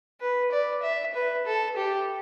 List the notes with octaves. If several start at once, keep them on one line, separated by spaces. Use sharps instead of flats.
B4
D5
E5
B4
A4
G4